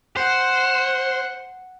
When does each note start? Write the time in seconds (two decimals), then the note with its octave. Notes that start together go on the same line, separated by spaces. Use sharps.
0.17 C5 F#5